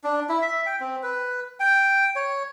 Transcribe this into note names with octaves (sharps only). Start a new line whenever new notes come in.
D4
E4
E5
G5
C4
B4
G5
C#5